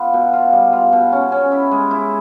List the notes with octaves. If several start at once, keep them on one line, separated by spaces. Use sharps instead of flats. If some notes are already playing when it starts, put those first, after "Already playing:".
Already playing: B3 F4
B2
F4
G3
F4
B2
C#4
C#4
E4
G#3
E4